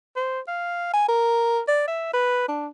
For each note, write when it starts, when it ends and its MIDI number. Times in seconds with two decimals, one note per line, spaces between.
0.16 0.40 72
0.48 0.89 77
0.94 1.07 80
1.08 1.61 70
1.68 1.87 74
1.88 2.12 76
2.14 2.46 71
2.49 2.68 62